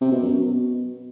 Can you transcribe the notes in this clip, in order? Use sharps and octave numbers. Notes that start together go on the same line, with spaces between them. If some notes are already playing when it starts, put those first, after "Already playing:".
C3
B2
F#2
B2